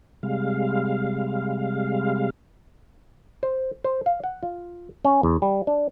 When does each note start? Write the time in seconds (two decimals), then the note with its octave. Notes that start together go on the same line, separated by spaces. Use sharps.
0.23 C3 G3 G#3 F5
3.43 C5
3.84 C5
4.06 F5
4.24 F#5
4.43 F4
5.05 C#4
5.23 E2
5.42 G3
5.67 D4